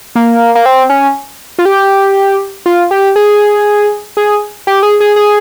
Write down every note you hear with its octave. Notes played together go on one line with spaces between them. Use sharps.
A#3
A#3
C4
C#4
F4
G4
F4
G4
G#4
G#4
G4
G#4
G#4
G#4